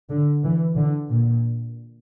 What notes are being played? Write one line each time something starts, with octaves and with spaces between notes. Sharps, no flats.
D3
E3
D3
A#2